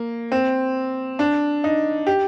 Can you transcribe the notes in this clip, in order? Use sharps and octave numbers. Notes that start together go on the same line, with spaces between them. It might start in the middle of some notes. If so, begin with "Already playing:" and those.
Already playing: A#3
C4
D4
D#4
G4